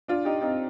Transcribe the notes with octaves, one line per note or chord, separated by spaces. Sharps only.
D4 F4
D#4 G4
C4 D#4